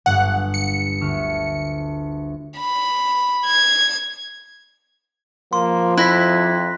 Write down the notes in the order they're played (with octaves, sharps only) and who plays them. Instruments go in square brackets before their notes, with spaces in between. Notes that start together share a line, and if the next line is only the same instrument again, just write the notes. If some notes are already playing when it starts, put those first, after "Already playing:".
[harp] G1 G2 [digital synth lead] F#5
[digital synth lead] C#7
[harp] D2 A3 F6
[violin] B5
G#6
[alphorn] F3 [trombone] A#3 [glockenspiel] C6
[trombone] F2 [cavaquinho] E4 [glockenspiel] F#6 A#6 B6